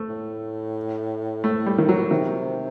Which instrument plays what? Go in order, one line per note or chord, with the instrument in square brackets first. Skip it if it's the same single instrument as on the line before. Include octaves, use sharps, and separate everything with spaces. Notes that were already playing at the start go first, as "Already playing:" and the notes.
Already playing: [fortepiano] A3
[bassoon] A2
[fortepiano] A3
G3
D#3
F#3
[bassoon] C3 [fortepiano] D#3